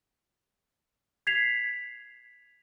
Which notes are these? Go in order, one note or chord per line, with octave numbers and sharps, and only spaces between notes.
G#6 B6 C7 F7